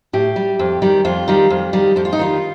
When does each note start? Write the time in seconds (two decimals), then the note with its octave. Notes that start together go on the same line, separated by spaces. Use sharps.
0.13 A2 G4
0.36 G3
0.59 F2
0.82 D#3 G3
1.05 F2 F4
1.28 D#3 G3
1.50 F2
1.73 D#3 G3
1.96 F2 G4
2.05 F4
2.13 D#4
2.19 D#3 G3 F4